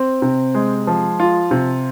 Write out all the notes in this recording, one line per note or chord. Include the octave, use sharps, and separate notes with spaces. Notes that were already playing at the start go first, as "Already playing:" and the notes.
Already playing: C4
C3
G#3
F3
F4
C3